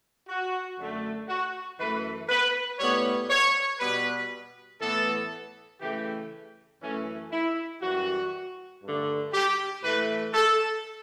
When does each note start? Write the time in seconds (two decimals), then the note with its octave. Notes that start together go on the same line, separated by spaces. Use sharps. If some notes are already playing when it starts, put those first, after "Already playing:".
0.28 F#4
0.78 F#2 D3 A3
1.28 F#4
1.79 F#2 E3 A3 B4
2.29 B4
2.79 A2 G3 B3 C#5
3.30 C#5
3.80 B2 G3 B3 B4
4.80 A2 E3 B3 A4
5.81 C#3 E3 A3 G4
6.82 F#2 E3 A3 C#4
7.32 E4
7.82 F#2 E3 G3 F#4
8.83 G2 D3 A3
9.33 G4
9.83 A2 E3 A3 B4
10.34 A4